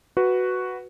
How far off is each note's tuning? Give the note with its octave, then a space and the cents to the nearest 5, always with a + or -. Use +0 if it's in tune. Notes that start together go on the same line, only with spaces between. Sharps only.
F#4 +0 B4 +0